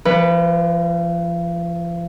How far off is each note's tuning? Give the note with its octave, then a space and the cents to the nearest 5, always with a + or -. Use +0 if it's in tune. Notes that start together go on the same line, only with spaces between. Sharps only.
F3 -35 B4 +0